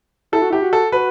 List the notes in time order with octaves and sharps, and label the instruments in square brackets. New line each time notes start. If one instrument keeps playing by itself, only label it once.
[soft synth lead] E4 [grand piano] A4
[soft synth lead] F#4
[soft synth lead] E4 [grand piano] G4
[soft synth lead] F#4
[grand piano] A4
[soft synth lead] F#4 [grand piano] B4